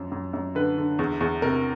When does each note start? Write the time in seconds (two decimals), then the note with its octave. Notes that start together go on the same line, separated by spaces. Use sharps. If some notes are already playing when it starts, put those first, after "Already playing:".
Already playing: F#2 F3
0.12 F#2
0.33 F#2
0.55 D3 B4
0.78 D3
0.99 E2
1.20 E2
1.42 C3 A#4